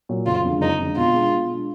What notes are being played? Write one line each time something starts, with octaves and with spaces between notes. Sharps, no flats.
A#2 F#3
F#1 F4
F2 D3 G#3
F#1 D#4
F2 D3 G#3
B2 F4
G#3 D4
B2
G#3 D4